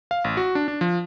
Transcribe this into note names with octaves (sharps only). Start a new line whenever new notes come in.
F5
A1
F#4
D4
D4
F3